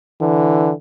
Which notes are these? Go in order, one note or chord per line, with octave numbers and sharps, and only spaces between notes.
D3 E3